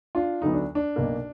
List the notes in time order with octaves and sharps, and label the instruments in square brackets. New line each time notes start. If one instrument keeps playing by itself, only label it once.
[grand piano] D4 F4
D2 D3 F#3 B3 D#4
D4
D4
B1 B2 A#3